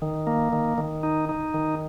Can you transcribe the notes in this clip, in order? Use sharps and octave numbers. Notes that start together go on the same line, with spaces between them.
D#3
A#3
D#3
D#3
D#4
D#4
D#3